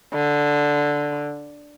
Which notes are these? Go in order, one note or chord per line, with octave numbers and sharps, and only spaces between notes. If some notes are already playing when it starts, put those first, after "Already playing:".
D3